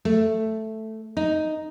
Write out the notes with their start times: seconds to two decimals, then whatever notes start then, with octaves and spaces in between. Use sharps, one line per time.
0.05 A3
1.17 D#4